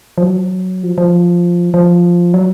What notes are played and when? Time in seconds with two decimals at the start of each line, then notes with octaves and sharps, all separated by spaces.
0.18 F3
0.22 F#3
0.83 F3
0.98 F3
1.74 F3
2.34 F#3